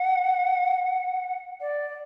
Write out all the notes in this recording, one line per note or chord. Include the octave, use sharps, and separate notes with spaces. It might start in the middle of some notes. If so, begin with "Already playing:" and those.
Already playing: F#5
D5
D5